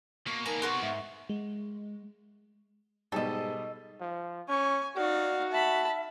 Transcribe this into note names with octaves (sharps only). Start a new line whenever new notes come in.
B2 A#3 C#6
G#3 A#3 B3 D#4 A#4 D5 G#5 A#5
B3 G4 A#4 C#5 C6 C#6
G#2 E5
G#3
G#2 B2 G3 A4 D#5
F3
C#4 G#5 C#6
D#4 F#4 D5 F5
E5 A5 B5